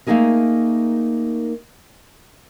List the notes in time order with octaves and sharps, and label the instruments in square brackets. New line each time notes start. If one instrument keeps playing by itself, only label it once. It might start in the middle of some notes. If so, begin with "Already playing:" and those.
[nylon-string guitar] A3 A#3 C#4 D#4 G#4 A#4